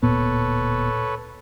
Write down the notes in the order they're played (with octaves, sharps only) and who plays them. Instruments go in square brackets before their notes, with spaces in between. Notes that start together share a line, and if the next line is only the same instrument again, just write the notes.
[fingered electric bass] D1 A#2 B3 [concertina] A4 B4 C#5